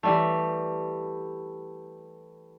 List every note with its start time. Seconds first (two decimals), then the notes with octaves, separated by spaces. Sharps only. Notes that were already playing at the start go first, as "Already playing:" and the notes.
0.03 E3 G3 A3